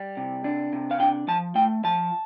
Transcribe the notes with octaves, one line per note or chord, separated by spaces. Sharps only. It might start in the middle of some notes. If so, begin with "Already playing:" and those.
Already playing: G3
C3
D4
C3
F5
D4 G5
F3 A5
A3 G5
F3 A5